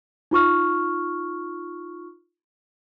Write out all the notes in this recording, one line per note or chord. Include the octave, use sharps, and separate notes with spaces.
D#4 F4 C#6 F6